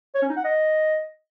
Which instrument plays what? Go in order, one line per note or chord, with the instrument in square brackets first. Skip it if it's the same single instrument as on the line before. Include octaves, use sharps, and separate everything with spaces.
[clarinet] C#5
C#4
D#4
F#5
D#5